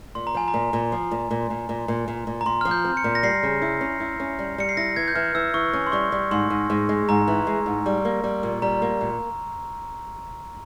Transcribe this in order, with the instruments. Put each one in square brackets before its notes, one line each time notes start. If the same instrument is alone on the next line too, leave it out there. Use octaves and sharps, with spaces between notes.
[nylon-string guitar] A#2 [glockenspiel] C6
[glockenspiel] A#5
[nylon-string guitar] F3 [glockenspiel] G#5
[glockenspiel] A#5
[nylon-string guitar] A#2
A#2
F3
A#2
A#2
A#2
A#2
A#2
A#2
A#2
[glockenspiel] A#5
[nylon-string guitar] A#2 [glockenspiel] C6
[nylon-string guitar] F3 [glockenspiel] F6
[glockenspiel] G6
[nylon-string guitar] C4
[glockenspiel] C#7
[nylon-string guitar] A#2
[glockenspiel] A#6
[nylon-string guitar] G3 [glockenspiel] C7
[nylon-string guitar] C#3
E4
C#4
E4
C#4
G3
[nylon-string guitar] G3 [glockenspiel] C#7
[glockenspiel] C7
[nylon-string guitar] E4 [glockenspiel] A#6
[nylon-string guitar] E3 [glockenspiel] G#6
[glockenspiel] G6
[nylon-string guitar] E3 [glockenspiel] F6
[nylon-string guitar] E3 [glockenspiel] E6
[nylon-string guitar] E3 [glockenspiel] C#6
[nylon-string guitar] C#4
[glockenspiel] C6
[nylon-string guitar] G3 [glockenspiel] C#6
[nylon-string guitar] G3
[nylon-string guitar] G#2 [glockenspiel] C6
[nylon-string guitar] G#2
G#2
G#3
[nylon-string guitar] G#2 [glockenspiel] A#5
[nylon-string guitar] E3
G#3
G#2
G3
A#3
G3
A#2
[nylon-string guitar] G3 [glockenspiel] A#5
[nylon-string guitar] A#3
A#2